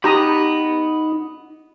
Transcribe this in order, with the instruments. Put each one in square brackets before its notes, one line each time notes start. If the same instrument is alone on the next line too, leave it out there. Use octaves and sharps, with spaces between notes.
[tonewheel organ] D#4 [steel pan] G4 A#5 D#6 [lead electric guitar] F#5 B5